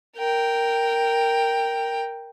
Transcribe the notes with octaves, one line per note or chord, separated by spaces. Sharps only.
A#4 G5